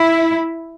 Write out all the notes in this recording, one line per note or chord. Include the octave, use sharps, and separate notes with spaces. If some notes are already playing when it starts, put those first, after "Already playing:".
Already playing: E4